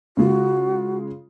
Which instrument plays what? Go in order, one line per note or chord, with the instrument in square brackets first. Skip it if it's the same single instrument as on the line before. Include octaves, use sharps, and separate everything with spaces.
[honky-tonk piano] C#3 G#3 F4 [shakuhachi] F#4